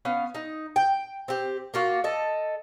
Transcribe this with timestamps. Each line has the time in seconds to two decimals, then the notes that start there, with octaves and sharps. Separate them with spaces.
0.05 B3 C#4 F5
0.35 D#4
0.76 G5
1.28 C4 G4
1.74 A#3 F4 F#4
2.04 A4 D#5